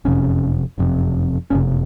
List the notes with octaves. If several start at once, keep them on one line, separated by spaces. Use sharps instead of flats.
F#1 F2 C3 C#4
F#1 F2 C3
F#1 F2 C3 C#4